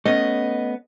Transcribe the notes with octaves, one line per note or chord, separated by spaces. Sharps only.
A3 B3 C#4 D#5